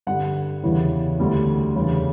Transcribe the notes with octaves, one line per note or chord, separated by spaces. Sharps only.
G2 D3 G3 F#5
E2 C#3 E3 G3
D2 D3 G3
E2 C#3 G3